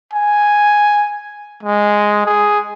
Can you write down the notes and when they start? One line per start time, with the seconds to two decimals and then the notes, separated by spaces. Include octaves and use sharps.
0.13 G#5
1.63 G#3
2.26 G#4